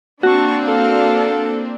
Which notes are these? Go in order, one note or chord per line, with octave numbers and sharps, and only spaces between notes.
A#3 C4 D4 F#4 A5 C#6
A4 F5 A5